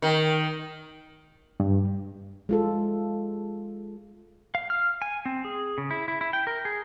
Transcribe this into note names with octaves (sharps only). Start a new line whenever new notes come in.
D#3
G2
G#3 F4 A4
F5
F6
G#5
C4
G#4
C#3
E4
E4
E4
G5
A#4
G#4